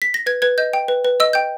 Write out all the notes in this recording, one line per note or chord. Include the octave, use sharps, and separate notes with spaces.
B6
A#6
B4 G#6
B4 G#6
D#5 G6
G5
B4
B4
D#5 E6
G5 G6